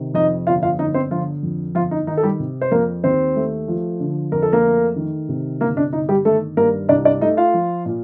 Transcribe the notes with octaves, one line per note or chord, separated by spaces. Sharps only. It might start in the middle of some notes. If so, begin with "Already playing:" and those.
Already playing: C3 D#3
F2 D#4 D#5
G1 F4 F5
F4 F5
G1 D#4 D#5
C4 C5
D3 F3 F4
F2
G1 F3 F4
D#4
D#3 D#4
A4
G3 G4
C3
C5
F2 A#3 A#4
D#2 C4 C5
A3
F3
D3
F2 A#4
A4
A#3 A#4
A3
D#3
C3
G1 A#3 A#4
D4
G1 D#4
G3 G4
D#3 A3 A4
G2 A#3 A#4
C2 D4 D5
D4 D5
A3 D#4 D#5
F4 F5
F3
A#2